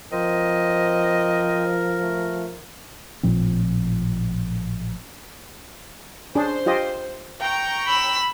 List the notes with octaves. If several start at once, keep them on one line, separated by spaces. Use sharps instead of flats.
F3 C4 A#4 C5 D#5
A3
A1 A#2 F3 C4
C#4 D4 G#4 C5
F4 G4 D#5
G5 A#5 C#6
B5 E6